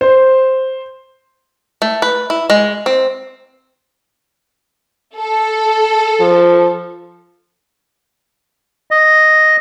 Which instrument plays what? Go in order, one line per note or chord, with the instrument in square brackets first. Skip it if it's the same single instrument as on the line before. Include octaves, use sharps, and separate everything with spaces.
[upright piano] C5
[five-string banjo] A3
B4
E4
G#3
C4
[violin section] A4
[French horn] F3
[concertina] D#5